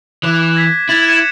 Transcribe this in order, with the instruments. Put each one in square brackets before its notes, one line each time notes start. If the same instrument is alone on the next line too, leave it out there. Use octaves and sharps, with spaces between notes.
[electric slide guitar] E3 [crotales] D6 F#6
[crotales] G#6 A#6 B6
[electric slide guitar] E4 [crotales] G#6 A6 F7
[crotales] C#7 D#7 E7